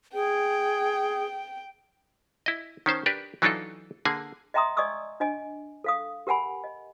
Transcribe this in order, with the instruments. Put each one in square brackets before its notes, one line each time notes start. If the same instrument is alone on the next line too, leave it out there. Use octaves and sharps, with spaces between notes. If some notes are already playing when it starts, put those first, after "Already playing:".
[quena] G#4 [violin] G5
[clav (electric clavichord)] E4 D#5
D#3 C#4 C5 A5
D4 G4 A#4 B4
E3 F#3 D4 D#4 F4 A4
D3 A#3 G#4 G#5
[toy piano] D#5 E5 G5 A#5 C6 D#6
D5 D#5 G#5 C#6 D#6 E6
D4 D#5 G#5
A4 F5 D#6
G4 A#4 F#5 G#5 B5
D#5